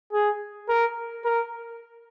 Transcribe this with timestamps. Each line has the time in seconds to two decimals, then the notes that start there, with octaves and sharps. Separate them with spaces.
0.13 G#4
0.69 A#4
1.25 A#4